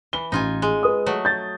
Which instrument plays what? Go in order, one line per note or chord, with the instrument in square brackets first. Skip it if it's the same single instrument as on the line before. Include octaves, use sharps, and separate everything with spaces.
[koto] E3 [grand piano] G7
[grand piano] A1 [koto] D#4 F4 G#5
[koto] G#3
[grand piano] B4 D#6
[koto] F#3 A3
[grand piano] G6 A6